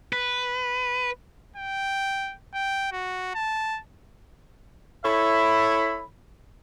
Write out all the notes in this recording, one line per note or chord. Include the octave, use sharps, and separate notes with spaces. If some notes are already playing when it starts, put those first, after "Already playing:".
B4
G5
G5
F#4
A5
E4 A4 C#5 E5 B5